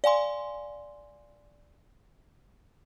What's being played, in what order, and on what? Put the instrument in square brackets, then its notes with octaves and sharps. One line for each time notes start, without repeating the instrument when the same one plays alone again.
[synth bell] D5 F5 G#5 C6